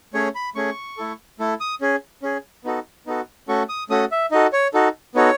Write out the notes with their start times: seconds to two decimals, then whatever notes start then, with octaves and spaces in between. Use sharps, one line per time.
0.14 A3 C#4 G#4 C#5
0.35 B5
0.55 A3 C#4 G#4 C#6
0.97 A3 E4 A4
1.39 A3 E4 A4
1.60 D#6
1.81 C#4 G#4
2.22 C#4 G#4
2.64 B3 D#4 F#4 A4
3.06 B3 D#4 F#4 A4
3.48 A3 C#4 F#4 A4 C#6
3.69 D#6
3.90 A3 C#4 F#4 A4 D#6
4.12 E5
4.31 D#4 F#4 A4 D#5
4.53 C#5
4.74 D#4 F#4 A4
5.15 B3 D#4 F#4 A4 C#5